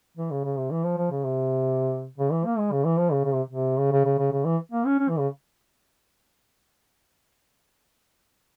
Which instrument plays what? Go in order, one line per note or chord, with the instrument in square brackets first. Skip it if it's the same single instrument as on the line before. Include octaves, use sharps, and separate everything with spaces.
[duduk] E3
C#3
C#3
C3
E3
F3
F3
C#3
C3
C#3
E3
A#3
G#3
C#3
E3
F3
C#3
C#3
C3
C3
C#3
C#3
C#3
C#3
C#3
E3
A#3
C#4
C#4
E3
C#3